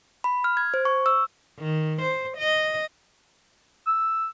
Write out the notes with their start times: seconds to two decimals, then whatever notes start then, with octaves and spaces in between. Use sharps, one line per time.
0.24 B5
0.44 F6
0.57 G#6
0.74 C5
0.85 C#6
1.06 E6
1.58 D#3
2.02 C5
2.37 D#5
3.87 E6